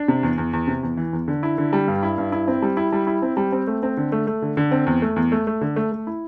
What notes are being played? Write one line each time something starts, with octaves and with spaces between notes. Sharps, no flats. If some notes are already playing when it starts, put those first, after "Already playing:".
Already playing: D4
C3
E2
E2
E2
C3
E2
E3
E2
D3
E4
D3
G3
G2
E4
G2
E4
C4
G3
E4
G3
E4
C4
G3
C4
A3
C4
D3
A3
A3
D3
D3
C4
E2
A3
E2
A3
A3
D3
A3
A3
E4